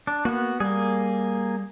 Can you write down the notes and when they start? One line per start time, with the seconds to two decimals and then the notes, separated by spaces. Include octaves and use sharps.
0.07 D4
0.25 A#3 B3 F#4
0.60 G3 A#3 G#4